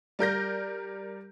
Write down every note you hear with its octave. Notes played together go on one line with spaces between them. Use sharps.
G3 A#4 G6 A#6